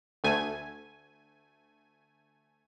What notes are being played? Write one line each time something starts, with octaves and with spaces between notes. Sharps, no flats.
D2 A3 G#5